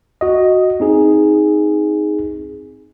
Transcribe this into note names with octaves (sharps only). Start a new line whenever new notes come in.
F#4 D#5
C4 D#4 G#4